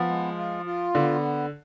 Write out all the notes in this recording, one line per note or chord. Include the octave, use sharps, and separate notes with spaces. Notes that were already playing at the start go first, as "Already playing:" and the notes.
Already playing: F3 B3
G#3
F4
F4
D3 B3